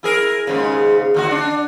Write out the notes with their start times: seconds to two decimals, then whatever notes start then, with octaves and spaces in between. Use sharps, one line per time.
0.03 E4 G#4 A#4
0.47 D#2 G#2 C#3
1.14 D#2 D3 F#4
1.31 D4